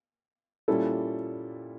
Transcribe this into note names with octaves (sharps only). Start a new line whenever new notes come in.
A#2 G3 C#4 E4 A4